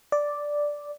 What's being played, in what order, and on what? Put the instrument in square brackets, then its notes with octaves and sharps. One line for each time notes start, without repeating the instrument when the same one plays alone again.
[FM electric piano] D5